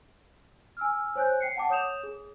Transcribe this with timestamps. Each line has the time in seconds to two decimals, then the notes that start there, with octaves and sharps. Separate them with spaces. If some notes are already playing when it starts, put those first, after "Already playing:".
0.77 G#5 E6 F6
1.16 C5 C#5 G#5 F#6 G6
1.40 G5 C7 C#7
1.56 F#5 A5 D6
1.70 C#5 D#6 G6 E7 F7
2.03 G#4